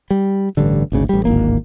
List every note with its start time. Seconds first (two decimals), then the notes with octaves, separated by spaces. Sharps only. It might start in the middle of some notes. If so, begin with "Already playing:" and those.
0.10 G3
0.57 A1 G2 D3
0.92 G#1 D2 C#3
1.09 A1 G3
1.25 D1 G#1 A#3